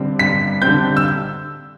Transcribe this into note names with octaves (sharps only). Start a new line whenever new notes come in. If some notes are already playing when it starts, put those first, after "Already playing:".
Already playing: G2 D3 G3 C4
G2 B6
D3 G3 C4 G6
E6